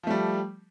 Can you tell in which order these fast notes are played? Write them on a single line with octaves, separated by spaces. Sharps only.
F3 A3 G3